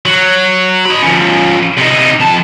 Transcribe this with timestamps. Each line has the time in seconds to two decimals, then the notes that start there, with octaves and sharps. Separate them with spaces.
0.05 F#3
0.85 D#4 B5
1.02 F3 C#4
1.77 C3 D#4
2.20 F2 A5